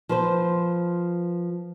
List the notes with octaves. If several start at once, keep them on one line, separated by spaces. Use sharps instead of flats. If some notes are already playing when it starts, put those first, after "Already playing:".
F3 B4 C5